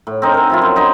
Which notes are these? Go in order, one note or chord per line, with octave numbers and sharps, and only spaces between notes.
A2
C4 D4 D#4 A#4
A#4 G#5
F3 E4 F4
F#2
D4 D#4 B4 C5